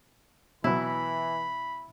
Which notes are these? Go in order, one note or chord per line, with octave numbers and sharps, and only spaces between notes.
B2 E3 F#3 E4 B4 B5